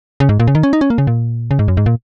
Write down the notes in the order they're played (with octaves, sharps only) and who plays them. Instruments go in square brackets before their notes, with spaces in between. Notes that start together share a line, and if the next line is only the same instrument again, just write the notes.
[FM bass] C#3
G#2
A#2
C#3
D#3
C#4
D#4
C#4
A#3
C#3
A#2
C#3
G#2
F#2
G#2
A#2